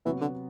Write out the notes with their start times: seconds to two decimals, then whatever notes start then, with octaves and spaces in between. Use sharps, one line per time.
0.05 C3 E3 F#3 B3 F#4
0.21 D3